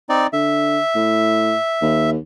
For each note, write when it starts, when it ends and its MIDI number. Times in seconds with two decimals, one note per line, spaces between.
0.09 0.27 60
0.09 0.27 63
0.09 0.27 74
0.33 0.78 50
0.33 2.10 76
0.95 1.54 45
1.82 2.17 39